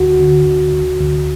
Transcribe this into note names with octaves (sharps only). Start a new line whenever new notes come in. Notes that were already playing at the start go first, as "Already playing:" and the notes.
Already playing: D2 F#4
D3
D2
D2
D2